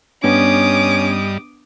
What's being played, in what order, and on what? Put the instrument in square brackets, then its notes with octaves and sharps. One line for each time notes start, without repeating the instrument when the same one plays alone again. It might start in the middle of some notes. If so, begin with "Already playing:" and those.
[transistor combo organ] G2 G3 D#5 [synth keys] B3 D4 [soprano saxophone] C#4 [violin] D6 D#6